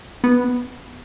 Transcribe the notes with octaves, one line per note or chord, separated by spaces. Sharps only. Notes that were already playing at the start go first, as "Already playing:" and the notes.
B3